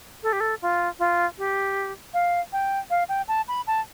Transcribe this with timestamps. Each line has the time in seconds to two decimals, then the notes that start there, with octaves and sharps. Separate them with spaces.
0.23 A4
0.33 G4
0.40 A4
0.62 F4
0.99 F4
1.38 G4
2.14 F5
2.53 G5
2.90 F5
3.09 G5
3.28 A5
3.48 B5
3.67 A5